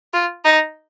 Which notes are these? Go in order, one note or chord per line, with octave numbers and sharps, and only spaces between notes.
F4
D#4